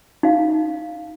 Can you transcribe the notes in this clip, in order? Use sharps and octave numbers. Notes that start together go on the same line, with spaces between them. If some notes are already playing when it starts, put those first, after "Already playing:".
D#4 F5